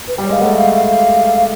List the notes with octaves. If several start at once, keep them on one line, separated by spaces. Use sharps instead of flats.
B4
G3
C#5
G#3 F5
A3 F#5
F5
F5